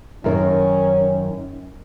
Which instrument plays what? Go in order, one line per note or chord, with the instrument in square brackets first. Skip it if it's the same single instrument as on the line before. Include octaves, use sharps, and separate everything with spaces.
[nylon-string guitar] F#2 D#3 A#4 [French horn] C#4